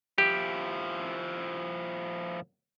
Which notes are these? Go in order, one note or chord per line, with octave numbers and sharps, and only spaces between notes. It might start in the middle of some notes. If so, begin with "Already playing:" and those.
F3 E4 G4